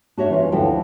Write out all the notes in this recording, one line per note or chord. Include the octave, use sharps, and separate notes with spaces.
D4 F#4 C#5 E5
E3 C#4 F4
D2 D3 F3 E4 F#4 G5